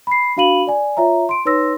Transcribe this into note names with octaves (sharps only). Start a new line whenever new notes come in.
B5 C7
D4 F#4 F5 B5 D#7 F#7
D5 G#5
F4 C#5 E5 A#5
C6 D7
D#4 B4 C#5 C6 E6 A#6